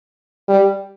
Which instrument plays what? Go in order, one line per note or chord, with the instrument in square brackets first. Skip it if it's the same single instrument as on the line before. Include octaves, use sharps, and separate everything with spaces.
[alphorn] G3